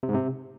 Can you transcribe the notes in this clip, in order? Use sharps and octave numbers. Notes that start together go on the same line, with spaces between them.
C3
G#2
C3